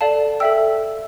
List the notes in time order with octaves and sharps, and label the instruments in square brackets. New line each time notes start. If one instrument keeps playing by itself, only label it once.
[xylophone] A4 D5 F5 A5
A4 E5 G5 E6